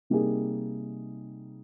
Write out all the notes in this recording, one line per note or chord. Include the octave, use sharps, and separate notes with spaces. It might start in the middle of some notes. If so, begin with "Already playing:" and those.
C3 G3 A#3 D#4 G#4